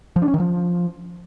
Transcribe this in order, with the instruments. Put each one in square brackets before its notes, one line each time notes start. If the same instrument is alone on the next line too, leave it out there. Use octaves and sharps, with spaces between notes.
[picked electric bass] F3
D4
C#4
D#3
F3